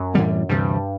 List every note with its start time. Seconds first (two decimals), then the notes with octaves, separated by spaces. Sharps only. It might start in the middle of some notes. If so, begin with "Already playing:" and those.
Already playing: F#2
0.14 A2 E3 G3 C4
0.49 D2 G2 C3 E3 G3